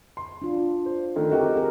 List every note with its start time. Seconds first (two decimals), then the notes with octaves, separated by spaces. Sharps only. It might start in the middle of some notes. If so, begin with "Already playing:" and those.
0.17 C6
0.42 D4 F4
0.86 C5
1.16 D3 D#3 A3
1.31 C4 F#4 G4 A#4 D#5 G5
1.55 G#4 A#4